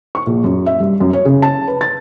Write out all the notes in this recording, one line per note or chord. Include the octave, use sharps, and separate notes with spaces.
C#6
A#1
F#2
E5
G2
F#2
C#5
C#3
A5
B4
A6